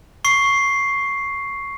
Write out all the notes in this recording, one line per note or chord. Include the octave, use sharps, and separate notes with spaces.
C#6 C7